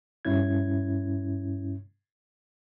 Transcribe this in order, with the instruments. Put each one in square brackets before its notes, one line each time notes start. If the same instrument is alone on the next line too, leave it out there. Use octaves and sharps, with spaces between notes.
[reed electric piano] G2 C#4 E4 G#6